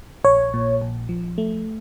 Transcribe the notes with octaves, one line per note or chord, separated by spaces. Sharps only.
A#1 C#5
A#2
A#1
F3
A3